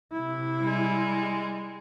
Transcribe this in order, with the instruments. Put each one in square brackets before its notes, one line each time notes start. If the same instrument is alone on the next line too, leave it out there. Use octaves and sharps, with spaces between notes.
[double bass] C3 E4
[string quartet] G3 G#3